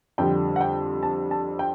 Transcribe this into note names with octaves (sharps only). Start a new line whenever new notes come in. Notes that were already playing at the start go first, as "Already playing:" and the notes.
F2 D3 G3 G5
F#5
G5
A5
A5
G5